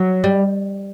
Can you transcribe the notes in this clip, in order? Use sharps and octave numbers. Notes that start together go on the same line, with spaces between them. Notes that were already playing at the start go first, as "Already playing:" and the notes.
Already playing: F#3
G3